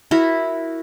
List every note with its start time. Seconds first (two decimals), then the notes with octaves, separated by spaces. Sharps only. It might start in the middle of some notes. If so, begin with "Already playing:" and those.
0.11 E4 F#4 A#4